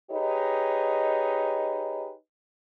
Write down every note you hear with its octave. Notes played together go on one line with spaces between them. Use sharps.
D#4 G4 G#4 B4 C#5 D#5